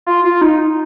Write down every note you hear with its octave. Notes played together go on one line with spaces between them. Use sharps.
F4
F4
D#4